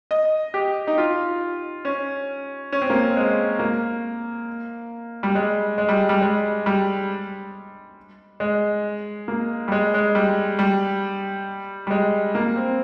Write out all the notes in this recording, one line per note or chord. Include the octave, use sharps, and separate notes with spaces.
D#5
G4
D#4
F4
C#4
C#4
C4
A#3
C4
G#3
A#3
G3
G#3
G#3
G3
G3
G#3
G3
G#3
A#3
G3
G#3
G#3
G3
G3
G3
G#3
A#3
C4